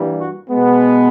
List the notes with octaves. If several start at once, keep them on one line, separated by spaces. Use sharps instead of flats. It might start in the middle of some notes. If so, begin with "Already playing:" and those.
Already playing: G2 E3 G3 A#3
F#4
B2 G#3 B3